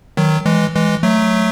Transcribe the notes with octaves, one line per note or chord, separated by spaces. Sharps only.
D#3 F#3
E3 G#3
E3 G#3
F#3 A3